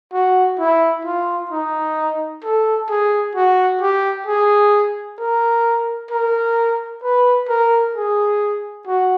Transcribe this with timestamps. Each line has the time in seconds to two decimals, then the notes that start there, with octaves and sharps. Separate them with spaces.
0.13 F#4
0.59 E4
1.05 F4
1.51 D#4
2.44 A4
2.89 G#4
3.35 F#4
3.81 G4
4.27 G#4
5.20 A#4
6.11 A#4
7.03 B4
7.49 A#4
7.95 G#4
8.87 F#4